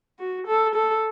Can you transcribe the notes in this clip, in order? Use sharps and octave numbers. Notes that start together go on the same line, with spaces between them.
F#4
A4
A4